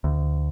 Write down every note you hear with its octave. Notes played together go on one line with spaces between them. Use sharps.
D2